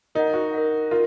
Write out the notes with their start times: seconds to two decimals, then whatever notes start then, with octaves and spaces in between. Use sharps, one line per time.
0.15 D#4 A#4 D#5 F#5
0.34 F#4
0.54 A#4 D#5 F#5
0.91 F4 A#4